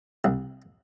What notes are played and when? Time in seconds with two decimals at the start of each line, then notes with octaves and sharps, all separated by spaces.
0.24 C2